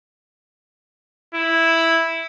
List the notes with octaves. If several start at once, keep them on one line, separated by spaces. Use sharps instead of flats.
E4